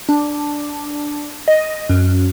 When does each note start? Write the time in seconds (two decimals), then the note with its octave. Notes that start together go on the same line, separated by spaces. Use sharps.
0.09 D4
1.48 D#5
1.90 F#2